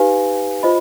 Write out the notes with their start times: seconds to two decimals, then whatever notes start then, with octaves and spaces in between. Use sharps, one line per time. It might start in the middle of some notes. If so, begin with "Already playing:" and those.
Already playing: D#4 G4 B4 F5 G#5
0.63 F4 C5 D#5 B5